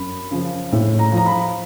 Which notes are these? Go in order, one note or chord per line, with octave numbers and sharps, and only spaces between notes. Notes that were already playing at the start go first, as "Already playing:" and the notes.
Already playing: F#2 B5
C#3 F3
A2
A#5
F3 A#5
B5